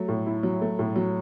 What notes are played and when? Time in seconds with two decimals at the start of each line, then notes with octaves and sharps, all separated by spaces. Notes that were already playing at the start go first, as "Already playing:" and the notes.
Already playing: F#3 A3
0.08 A2
0.26 E4
0.43 F#3
0.61 A3
0.79 A2
0.96 F#3